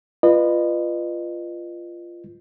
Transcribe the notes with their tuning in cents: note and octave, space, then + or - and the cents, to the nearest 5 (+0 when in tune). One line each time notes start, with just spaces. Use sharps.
F4 -15 B4 +0 D#5 -35